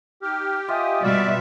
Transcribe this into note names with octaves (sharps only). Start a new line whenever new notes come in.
D#4 G4 F6
F4 D#5 E5 G#5 D#6
B2 G3 F#4 D5 E5 F6